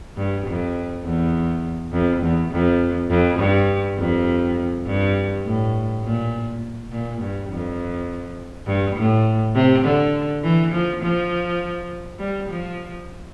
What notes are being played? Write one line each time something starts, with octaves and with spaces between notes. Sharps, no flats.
G2
F2
E2
F2
E2
F2
F2
G2
F2
G2
A2
A#2
A#2
G2
F2
G2
A2
C3
D3
E3
F3
F3
G3
F3